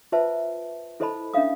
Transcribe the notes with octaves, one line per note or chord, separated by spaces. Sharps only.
F4 B4 C5 E5 A5
E4 A4 C5 D#5 A5 B5
C#4 D4 E5 F5 D#6